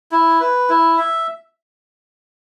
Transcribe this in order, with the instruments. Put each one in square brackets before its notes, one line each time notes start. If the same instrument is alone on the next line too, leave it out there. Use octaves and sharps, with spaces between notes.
[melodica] E4
B4
E4
E5